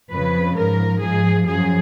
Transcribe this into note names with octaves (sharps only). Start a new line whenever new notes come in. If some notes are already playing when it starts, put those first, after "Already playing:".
F2 C#3 F3 B4
G#2 F3 A#4
G#2 F3 G#4
F#2 F3 G#4